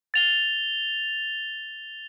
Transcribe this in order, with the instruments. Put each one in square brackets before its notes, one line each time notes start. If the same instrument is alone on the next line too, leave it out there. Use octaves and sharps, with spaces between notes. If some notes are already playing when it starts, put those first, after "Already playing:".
[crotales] A6 F7 G7